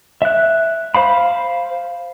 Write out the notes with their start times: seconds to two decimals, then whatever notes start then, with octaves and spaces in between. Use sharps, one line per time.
0.22 E5 F#6
0.95 C5 F5 B5